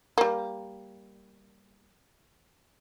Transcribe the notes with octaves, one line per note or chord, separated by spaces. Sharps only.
G3 A#3